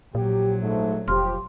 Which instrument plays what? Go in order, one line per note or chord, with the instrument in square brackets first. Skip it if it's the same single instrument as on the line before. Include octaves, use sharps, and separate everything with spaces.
[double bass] A#1 F#3 [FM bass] A#2 [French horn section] G4
[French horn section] G#2 A3
[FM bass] F1 [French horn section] F3 G4 [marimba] C6 F6